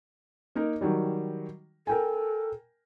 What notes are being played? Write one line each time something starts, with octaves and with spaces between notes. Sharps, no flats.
A#3 D#4 A#4
D#3 F#3 G3
A4 A#4 G5 G#5